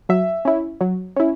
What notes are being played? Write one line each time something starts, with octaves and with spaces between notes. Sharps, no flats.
F#3 E5
C#4 E4
F#3
C#4 E4